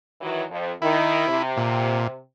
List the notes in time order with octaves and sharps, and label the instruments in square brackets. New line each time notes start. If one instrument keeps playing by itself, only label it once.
[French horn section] D#3 E3 F#3
F2
[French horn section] D#3 [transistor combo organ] E4
[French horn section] C3
[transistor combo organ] A#2